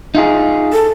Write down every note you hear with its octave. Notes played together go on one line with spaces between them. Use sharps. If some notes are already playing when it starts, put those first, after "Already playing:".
D#4 F4 G#4
A4